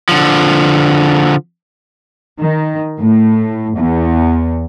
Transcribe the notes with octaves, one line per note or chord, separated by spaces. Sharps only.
D3 F3
D#3
A2
E2